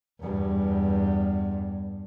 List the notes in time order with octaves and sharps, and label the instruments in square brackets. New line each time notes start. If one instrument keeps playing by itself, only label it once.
[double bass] E2 G2